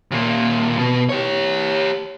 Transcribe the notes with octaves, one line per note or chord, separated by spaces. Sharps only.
D#2 A#2
B2
G4 C#5